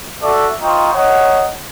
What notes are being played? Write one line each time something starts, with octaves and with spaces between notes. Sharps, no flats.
F#4 A4 D5 E5
C4 D#4 F4 G5 C#6
D#4 C#5 D#5 F#5